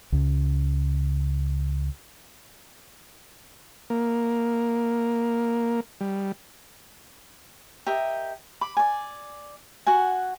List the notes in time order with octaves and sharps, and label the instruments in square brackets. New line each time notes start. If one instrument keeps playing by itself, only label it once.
[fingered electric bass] C#2 C#3
[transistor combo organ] A#3
G3
[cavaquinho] G4 A#4 D#5 E5
B5 D6
D5 G#5
F#4 F#5 G#5